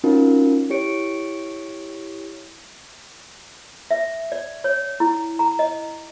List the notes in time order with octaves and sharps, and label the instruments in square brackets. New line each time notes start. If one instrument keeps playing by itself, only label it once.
[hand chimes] C4 C#4 D#4 F4 F#4 A#4
E4 G4 C#5 C#7 D7
[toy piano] E5
D5
C#5
E4
A#5
D#5